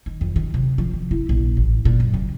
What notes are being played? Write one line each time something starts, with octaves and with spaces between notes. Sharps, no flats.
D#3
F2
D#3
C3
F3
D#3
E4
A#1
A1
A#2
F#2
C#3